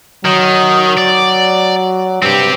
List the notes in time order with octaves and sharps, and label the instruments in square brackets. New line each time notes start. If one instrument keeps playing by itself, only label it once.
[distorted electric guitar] D#3 [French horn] F#3
[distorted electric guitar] D5
[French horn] G2 [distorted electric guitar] C4 G4